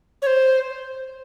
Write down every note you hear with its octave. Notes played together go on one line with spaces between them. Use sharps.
C#5
C5